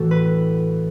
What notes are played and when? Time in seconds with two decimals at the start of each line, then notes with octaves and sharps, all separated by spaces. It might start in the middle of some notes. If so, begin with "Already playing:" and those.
Already playing: A2 E3 A3 F#4 A4
0.11 B4